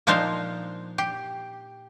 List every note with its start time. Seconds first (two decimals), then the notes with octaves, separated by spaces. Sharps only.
0.07 A#2 F3 D4 D#4 C5 F5
0.98 G4